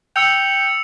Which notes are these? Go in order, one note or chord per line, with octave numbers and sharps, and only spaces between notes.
G5 E6 C#7 F7